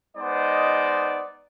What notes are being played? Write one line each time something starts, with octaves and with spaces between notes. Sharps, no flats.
G#3 B3 D#4 C5 D5 D#5